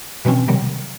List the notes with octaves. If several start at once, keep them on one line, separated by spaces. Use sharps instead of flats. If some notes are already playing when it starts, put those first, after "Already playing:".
B2 E3 F#3 C4 C#4
C3 D#3 F#3 G3